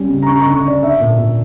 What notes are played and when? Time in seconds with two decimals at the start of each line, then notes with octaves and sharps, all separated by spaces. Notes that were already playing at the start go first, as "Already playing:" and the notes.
Already playing: G3 C#4
0.09 C#3
0.23 A#5
0.27 C#4 C#6
0.36 A#5
0.41 C#6
0.46 D3
0.54 C#6
0.63 D3 D5
0.82 D4 E5
1.00 A#2
1.18 A#2